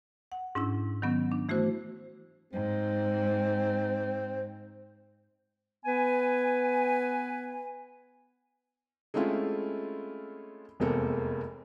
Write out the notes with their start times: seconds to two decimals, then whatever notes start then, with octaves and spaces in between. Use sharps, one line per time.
0.32 F#5
0.55 G#2 C#4 D4 E4
1.02 D#3 F#3 B3 C#4
1.32 D4
1.49 E3 A3 E4 F#4 C5
2.53 G#2 C4
5.85 B3 B4 G#5
9.14 G#3 A3 C4 C#4 E4 F4
10.80 F1 E2 G#3 A#3 C4 A4